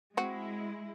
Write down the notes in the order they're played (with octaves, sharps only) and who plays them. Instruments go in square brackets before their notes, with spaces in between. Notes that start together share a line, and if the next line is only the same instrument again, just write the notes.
[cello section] G#3 E4 [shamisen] C4 F#4